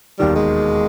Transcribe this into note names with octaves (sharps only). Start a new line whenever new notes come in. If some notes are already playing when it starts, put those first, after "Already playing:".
E1 D#2 D#3 G3
G#3